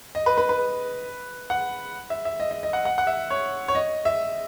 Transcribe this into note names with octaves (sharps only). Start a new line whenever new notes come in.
D#5
B4
B4
B4
F#5
E5
E5
D#5
D#5
D#5
F#5
F#5
F#5
E5
C#5
C#5
D#5
E5